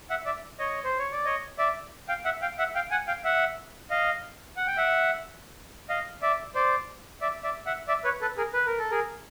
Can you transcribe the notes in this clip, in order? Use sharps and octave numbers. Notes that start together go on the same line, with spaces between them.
E5 F#5
D5 E5
C#5 D#5
C5
C#5
D5
C#5 D#5
D5 E5
F5 G5
E5 F#5
F5 G5
E5 F#5
F5 G5
F#5 G#5
F5 G5
E5 F#5
D#5 F5
F#5
G5
E5 F#5
D#5 F5
D5 E5
C5 D5
D5 E5
D5 E5
E5 F#5
D5 E5
B4 C#5
A4 B4
G#4 A#4
B4
A#4
A4
G#4 A#4